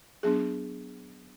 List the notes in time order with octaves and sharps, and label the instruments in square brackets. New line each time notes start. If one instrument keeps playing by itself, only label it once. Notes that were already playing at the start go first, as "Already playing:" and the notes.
[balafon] F#3 B3 D4 G#4